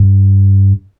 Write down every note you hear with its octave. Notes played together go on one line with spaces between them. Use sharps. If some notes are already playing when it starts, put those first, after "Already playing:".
Already playing: G2